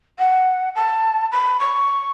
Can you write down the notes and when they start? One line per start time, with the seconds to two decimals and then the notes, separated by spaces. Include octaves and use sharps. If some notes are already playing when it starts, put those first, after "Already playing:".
0.19 F#5
0.75 A5
1.32 B5
1.60 C#6